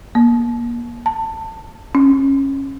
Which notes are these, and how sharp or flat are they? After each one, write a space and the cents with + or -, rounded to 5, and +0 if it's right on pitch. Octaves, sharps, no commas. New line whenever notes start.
A#3 +30
A5 +20
C#4 -20